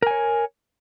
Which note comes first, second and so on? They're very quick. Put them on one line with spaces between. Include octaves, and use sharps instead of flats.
A#4 G#5 C#5